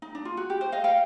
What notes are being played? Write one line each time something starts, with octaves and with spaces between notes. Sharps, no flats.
D#4
D4
F4
F#4
G4
C5
D#5 F5
F5 G5